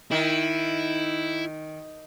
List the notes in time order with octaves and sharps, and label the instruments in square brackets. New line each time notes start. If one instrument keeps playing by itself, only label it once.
[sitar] D#3 [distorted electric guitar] E4